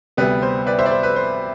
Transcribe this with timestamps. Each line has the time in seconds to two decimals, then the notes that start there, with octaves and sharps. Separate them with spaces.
0.17 D2 C3 G3 B3 B4
0.42 C5
0.66 B4 D5
0.79 C5 E5
0.86 D5
0.91 C5
1.03 B4
1.16 C5